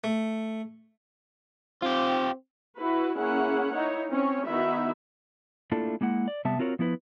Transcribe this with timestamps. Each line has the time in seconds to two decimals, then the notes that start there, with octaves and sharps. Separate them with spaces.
0.04 A3
1.82 C4 F4 G4
2.78 E4 F#4 B4
3.17 A#3 C#4 E4 G#4 F#5
3.74 D#4 E4 C#5
4.10 C4 C#4 C#5
4.46 D#3 B3 D#4 E4 F#4 E5
5.72 A3 A#3 D4 E4 F4 A4
6.01 G#3 A#3 E4 F#5
6.28 D5
6.45 C3 G3 B3 E5 A5
6.59 C4 F4 F#4 A#4 C#5
6.79 F3 B3 E4 B4